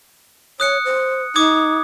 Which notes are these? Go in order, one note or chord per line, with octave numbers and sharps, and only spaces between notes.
C#5 D#6 F#6 C#7
C5
D#4 D6 D#6 G#6